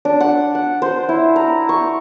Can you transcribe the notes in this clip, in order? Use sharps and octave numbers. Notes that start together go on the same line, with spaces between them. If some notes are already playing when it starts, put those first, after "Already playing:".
D4
F#5
F#5
C5
E4
A#5
C#6